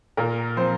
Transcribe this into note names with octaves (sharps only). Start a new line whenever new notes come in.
A#2 A#4
F3 C4 C5